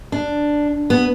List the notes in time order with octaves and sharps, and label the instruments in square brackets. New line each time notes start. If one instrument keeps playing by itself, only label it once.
[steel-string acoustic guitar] D4
B3